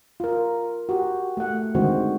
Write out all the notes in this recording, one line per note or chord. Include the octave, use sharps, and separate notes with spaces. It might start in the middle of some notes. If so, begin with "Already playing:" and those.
F4 A#4
F#4 G4
A3 F#5
D3 D#3 G#3 C4 F#4 C5